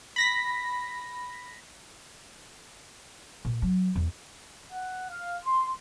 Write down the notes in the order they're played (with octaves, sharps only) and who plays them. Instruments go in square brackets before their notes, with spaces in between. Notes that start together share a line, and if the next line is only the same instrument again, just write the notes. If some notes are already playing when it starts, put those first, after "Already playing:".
[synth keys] B5 A#6 B6
[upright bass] A#2
F#3
E2
[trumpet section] F#5
F5
C6